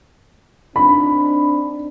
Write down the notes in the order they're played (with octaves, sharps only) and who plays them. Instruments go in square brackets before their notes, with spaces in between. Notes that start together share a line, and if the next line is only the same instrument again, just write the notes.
[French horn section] C4 D4 D#4 [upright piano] B5